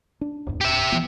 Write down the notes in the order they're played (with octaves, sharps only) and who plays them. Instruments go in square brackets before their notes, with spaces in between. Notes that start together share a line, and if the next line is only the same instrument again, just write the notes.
[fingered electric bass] D4
D1 E2 G#2
[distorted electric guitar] G4 E5
[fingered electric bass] E3 F3 B3